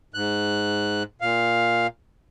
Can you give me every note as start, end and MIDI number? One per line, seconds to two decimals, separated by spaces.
0.14 1.03 44
0.14 1.03 90
1.21 1.87 46
1.21 1.87 77